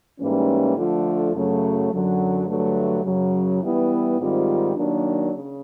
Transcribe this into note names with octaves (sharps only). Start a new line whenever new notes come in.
G#2 E3 G3 A#3 C#4
D3 F3 A3 D4 F4
F#2 C#3 F#3 A3
F#2 D3 F#3
G2 D3 F#3 A3
F#2 C#3 F#3
E3 G3 B3 E4
G#2 D#3 G3 C4 F4
D#3 F#3 A#3 D4
C#3